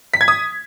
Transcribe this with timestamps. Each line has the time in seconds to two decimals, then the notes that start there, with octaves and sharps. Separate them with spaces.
0.14 B6
0.21 G#6
0.28 D#6